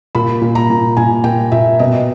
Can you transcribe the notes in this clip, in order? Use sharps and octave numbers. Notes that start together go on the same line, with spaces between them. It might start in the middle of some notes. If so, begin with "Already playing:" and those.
A#2 B5
A#2
A#5
A#2
A#2 G#5
A#2 G5
A#2 E5
B2 D#5